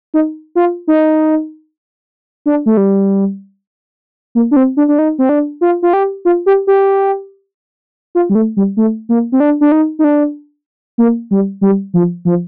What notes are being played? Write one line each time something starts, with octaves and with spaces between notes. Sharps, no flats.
D#4
F4
D#4
D4
A3
G3
A#3
D4
C4
D4
D4
D#4
C4
D4
F4
F4
G4
F4
G4
G4
F4
G3
A3
G3
A3
A#3
C4
D4
D4
D#4
D#4
D4
A#3
G3
G3
F3
F3